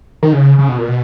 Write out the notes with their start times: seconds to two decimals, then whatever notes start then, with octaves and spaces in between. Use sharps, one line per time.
0.23 D#3
0.33 C#3
0.59 C#3
0.69 B2
0.78 A#2
0.88 B2